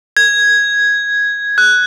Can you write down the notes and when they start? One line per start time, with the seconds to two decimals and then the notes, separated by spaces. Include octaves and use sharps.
0.17 G#6
1.58 F#6